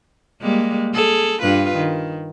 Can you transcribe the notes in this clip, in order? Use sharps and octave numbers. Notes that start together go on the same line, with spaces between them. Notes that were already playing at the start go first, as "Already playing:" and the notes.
G3 G#3 A#3
G#4 A4
G2 F4 B4
D#3